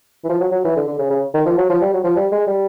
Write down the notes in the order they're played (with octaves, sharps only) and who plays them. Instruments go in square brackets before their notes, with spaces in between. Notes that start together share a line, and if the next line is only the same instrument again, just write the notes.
[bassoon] E3
F3
F#3
F#3
E3
D3
D3
C#3
C#3
D#3
F3
F#3
F3
G3
F#3
F3
G3
G#3
G3